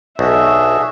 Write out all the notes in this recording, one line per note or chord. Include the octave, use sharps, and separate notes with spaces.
B1 D4 F#4 G#4 E5